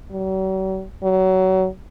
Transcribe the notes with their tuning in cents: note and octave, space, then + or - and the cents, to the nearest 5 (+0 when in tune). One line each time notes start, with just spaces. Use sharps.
F#3 +45
F#3 +25